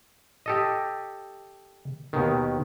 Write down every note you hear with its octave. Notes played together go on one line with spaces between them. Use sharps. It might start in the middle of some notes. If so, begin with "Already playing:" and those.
G4 A4 D#5
D#2 B2 D#3